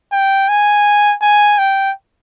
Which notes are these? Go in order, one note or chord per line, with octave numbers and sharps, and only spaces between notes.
G5
G#5
G#5
G5